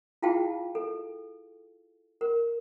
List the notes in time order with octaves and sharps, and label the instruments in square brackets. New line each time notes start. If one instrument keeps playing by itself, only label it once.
[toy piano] E4 F4 G#4 F5 G5 A5
A4
A#4